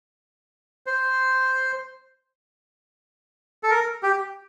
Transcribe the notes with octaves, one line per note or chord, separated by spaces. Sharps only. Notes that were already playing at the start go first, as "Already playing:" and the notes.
C5
A4
A#4
G4